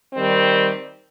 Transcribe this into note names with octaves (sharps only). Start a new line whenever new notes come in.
D#3 G3 C4